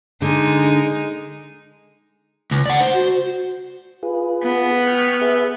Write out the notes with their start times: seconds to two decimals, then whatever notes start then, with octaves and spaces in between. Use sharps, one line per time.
0.22 D3 G#3 D#4
2.51 C#2
2.66 D5 F#5
2.80 C5
2.94 F#4
4.03 F4 G#4 B4
4.44 B3
4.87 G5 C#6 F6
5.21 G#4 B4 E5